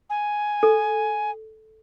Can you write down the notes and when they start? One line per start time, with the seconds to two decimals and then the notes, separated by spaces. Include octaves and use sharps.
0.10 G#5
0.63 A4